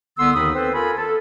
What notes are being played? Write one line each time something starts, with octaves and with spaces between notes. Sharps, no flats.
C2 D3 B3 C6 E6
D#2 D#3 D#4 B5 D#6
C4 A4 B4 C5
F4 A4 A#4 G#5 B5
A4